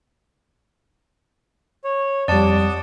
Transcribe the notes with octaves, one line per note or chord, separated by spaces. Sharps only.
C#5
F2 G3 D5 D#5 F#5 A5 D6